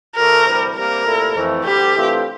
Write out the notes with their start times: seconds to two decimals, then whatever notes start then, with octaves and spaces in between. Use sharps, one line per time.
0.16 D2 D3 A3 A#4
0.46 D2 C3 E3 G3
0.76 C3 G3 A#3 A#4
1.05 C2 A#2 A3 E4 A4
1.35 F2 E3 A3
1.65 D2 D3 G3 G4
1.94 G2 E3 A3 C4 F4